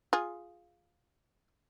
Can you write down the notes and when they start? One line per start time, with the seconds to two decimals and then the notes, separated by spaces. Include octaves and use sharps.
0.13 F4 G#4